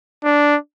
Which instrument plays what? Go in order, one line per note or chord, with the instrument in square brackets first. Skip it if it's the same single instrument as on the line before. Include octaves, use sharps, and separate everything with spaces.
[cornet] D4